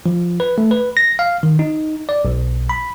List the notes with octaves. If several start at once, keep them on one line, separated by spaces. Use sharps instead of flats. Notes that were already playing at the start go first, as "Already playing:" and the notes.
F3
B4
A3
B4
A#6
F5
D#3
D#4
D5
B1
B5